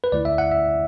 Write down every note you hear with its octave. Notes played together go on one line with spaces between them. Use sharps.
B4
D2 D3 A3 E4 D5
E5
F#5
E5